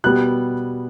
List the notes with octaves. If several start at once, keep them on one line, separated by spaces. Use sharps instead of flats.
B2 G3 B3 F#6